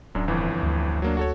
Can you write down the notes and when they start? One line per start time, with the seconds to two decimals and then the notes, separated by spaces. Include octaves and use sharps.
0.15 D1 F#2 F#3 D4
0.28 G1 F2 E3
0.63 D2
1.02 F#3 A#3 D4
1.17 F#4 A4 C#5